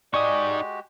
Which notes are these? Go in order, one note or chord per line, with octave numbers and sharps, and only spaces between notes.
G#3 D#4 F#4 G4 D5 G#5 C#6 D#6